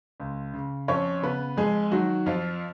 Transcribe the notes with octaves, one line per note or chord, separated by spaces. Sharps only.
C#2
C#3
F2 C#4 C#5
C#3 B3 B4
F2 G#3 G#4
D#3 F#3 F#4
F2 F3 F4